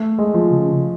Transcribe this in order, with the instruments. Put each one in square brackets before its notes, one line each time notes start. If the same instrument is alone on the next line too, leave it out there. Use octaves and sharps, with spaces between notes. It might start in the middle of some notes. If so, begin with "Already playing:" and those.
Already playing: [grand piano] A3
G#3
F3
[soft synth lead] C#3